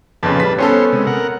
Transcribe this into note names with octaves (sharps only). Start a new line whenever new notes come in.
F2 A#2 C#3 B4 A5
G3 B6
B3 C#4 A4 C5 C#5
C3 G#3
A#4 F#5